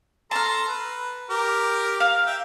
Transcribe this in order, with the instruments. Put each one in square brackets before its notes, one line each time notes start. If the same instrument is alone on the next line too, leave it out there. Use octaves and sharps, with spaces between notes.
[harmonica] A4 A#5 C6 [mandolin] A5 F6
[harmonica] B4
G4 A#4
[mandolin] F5
[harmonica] E5 G5